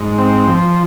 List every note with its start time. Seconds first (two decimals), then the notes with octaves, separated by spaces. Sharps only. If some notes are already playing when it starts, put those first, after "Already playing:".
Already playing: G#2
0.18 C4
0.48 F3